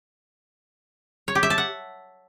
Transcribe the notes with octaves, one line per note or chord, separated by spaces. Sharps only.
C#5
G4
E5
A5
F#5